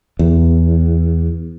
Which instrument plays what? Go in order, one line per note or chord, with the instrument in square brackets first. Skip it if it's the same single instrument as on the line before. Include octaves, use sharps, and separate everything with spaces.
[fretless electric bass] E2